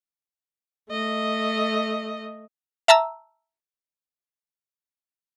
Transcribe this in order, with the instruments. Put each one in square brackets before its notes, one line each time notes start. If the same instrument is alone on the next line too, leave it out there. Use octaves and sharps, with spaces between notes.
[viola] A3 D#5
[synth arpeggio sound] E5 A5 A#5 E6